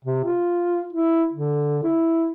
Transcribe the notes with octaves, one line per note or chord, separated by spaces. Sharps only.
C3
F4
E4
D3
E4